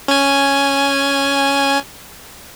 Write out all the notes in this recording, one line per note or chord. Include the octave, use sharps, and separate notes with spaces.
C#4 G#5